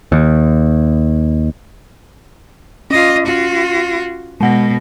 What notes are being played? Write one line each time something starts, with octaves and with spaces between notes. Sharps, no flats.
D#2
C#4 F4 D#5
F4 F#4
B2 G#3 F#5 A#6